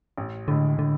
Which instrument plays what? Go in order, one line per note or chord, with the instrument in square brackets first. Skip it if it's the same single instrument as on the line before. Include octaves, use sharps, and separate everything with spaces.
[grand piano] A1
[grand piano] A2 G#3 [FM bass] D3
[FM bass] D3